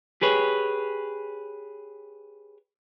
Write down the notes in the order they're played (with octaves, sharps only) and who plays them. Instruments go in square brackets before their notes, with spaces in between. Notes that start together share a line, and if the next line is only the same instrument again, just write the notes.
[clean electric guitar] G4 G#4 B4 C#5